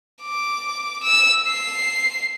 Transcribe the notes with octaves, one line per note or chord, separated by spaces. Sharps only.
D6
E6
C7